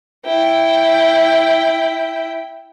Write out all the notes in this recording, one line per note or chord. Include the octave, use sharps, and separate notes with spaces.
E4 G5